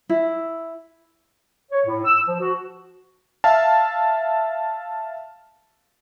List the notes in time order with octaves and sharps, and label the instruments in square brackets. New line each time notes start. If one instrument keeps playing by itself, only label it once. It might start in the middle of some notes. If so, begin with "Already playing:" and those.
[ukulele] E4
[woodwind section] C#5
A2
E6
F3
F#4
[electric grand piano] E5 F5 A5